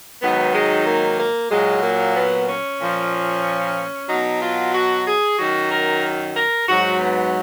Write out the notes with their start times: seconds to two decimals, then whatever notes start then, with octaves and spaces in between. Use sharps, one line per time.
0.22 G#2 D#3 F#3 B3
0.55 G#3
0.87 A#3
1.19 A#3
1.51 A#2 F#3 G#3
1.83 A#3
2.17 B3
2.49 C#4
2.81 A#2 F3
4.09 B2 F#3 D#4
4.42 F4
4.74 F#4
5.07 G#4
5.39 F#2 D#3 F#3 F#4
5.72 A#4
6.36 A#4
6.69 G#2 F#3 F#4
7.00 B3